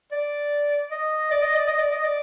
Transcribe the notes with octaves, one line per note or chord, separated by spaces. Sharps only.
D5
D#5
D5
D#5
D5
D#5
D5
D#5
D5